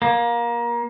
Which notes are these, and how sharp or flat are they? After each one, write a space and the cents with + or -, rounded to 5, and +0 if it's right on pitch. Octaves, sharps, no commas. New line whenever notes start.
A#3 +25